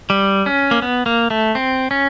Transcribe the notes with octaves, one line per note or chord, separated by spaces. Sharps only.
G3
C#4
A#3
B3
A#3
A3
C4
C#4